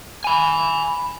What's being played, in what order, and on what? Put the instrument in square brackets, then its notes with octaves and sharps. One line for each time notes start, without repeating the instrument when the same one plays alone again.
[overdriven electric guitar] G#5 B5